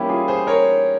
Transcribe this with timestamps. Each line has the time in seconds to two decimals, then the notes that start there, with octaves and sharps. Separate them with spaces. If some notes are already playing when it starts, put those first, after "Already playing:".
Already playing: E3 G3 A#3 C#4 E4 G4
0.09 F4 G#4
0.28 G#4 C5
0.47 A#4 C#5